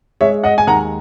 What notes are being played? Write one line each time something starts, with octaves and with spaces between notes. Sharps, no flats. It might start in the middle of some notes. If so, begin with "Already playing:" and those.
G#3 C#5 E5
D#5 F#5
G#5
D#2 F#5 A#5